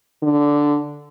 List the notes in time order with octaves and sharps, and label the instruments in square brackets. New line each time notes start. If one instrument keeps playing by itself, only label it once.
[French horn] D3